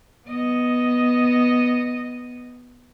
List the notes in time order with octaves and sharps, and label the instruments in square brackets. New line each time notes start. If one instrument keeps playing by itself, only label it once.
[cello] B3 D#5